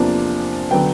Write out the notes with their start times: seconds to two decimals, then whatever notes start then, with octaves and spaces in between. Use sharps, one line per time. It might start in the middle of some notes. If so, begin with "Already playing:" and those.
Already playing: E2 C3 F3 A#3 D4
0.71 D3 F#3 B3 G5